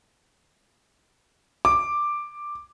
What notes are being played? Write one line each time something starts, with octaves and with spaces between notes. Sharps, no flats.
D6